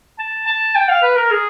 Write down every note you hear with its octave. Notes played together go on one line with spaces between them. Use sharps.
A5
A5
G5
F5
B4
A#4
G#4